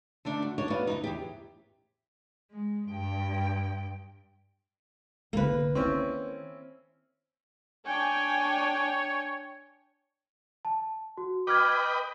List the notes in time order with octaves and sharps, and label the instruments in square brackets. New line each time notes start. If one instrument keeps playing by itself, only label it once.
[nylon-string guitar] D3 A3 D4 D#4
F#4
D4 D#4 C#5
B3 F#4 D5 F5
D2 D#3 D#4
E2 C3 G4
[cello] G#3
G2 G5
[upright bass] C2 D3 [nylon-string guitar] A#3 B4
[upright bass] D#3 [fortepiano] C4 C#4 E4
[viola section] D4 G5 G#5 [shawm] C#5
[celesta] A5
F#4
[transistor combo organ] B4 D#5 G5 [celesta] D6 F6 G#6